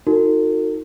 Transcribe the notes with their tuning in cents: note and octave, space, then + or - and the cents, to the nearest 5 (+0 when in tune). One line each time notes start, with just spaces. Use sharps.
D#4 +20 F#4 -25 A#4 -45